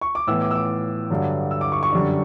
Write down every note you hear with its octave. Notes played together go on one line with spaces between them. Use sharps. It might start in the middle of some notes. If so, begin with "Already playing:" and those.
C#6
D6
A2 E3 B3 E6
D6
E6
D6
G2 D3 F#3
E6
D6
C#6
C#6
F#2 D3 G3 D4